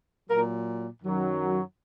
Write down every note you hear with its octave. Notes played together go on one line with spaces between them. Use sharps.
A#2 F#3 A#4
F#2 D#3 F#3